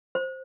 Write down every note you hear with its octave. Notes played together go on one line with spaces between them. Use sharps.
C5